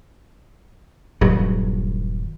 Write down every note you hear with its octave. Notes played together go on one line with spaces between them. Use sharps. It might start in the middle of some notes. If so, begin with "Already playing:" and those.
D#1 G2 F#3